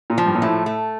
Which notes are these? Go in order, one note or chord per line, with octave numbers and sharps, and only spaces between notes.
A#2
F3
G2
A#2
A2 A3
A3